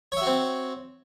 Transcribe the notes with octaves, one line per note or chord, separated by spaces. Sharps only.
C4 F#4 C#5 E5